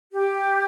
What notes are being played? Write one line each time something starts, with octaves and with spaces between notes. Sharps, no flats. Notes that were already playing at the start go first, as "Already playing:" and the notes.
G4